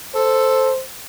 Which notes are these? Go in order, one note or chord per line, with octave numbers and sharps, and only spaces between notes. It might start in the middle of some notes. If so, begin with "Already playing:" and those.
A4 C5